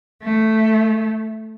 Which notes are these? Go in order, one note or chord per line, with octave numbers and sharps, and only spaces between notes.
A3